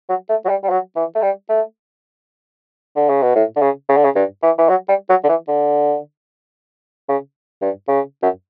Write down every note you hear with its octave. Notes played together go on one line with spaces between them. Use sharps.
F#3
A3
F#3
G3
G3
F#3
E3
A3
G3
A3
D3
C#3
B2
A2
D3
C#3
C#3
D3
C#3
G2
E3
E3
F#3
G3
F#3
D3
E3
D3
C#3
G2
C#3
F#2